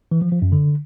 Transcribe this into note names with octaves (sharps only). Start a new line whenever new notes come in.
E3
F3
F3
F#2
D3